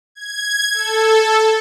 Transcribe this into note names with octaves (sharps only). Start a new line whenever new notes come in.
G#6
A4